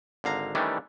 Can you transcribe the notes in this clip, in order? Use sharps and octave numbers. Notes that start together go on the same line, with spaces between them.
G#1 D3 F5 A#5
D#3 E3 G3 A3 C#4 D4